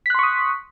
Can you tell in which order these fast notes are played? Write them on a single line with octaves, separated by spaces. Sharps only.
B6 F#6 C6 C#6 D#6